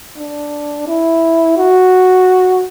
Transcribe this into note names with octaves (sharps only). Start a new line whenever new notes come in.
D4
E4
F#4